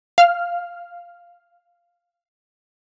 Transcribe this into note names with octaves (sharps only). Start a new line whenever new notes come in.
F5 F6